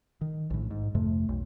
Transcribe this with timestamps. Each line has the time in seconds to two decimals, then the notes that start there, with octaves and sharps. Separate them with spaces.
0.21 D#3
0.50 A#1 A2
0.71 G#2
0.95 F2 C3 A3
1.29 B1